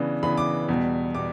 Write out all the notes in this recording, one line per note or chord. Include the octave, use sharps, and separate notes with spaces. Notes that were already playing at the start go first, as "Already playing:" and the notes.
Already playing: C#3 E3 B3 D4
C#3 E3 B3 D4 B5
D6
E2 B2 G3
B2 G3 D6